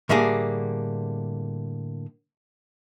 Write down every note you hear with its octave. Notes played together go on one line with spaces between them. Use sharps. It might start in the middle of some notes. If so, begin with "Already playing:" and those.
A2 D3 G3 A#3 G#4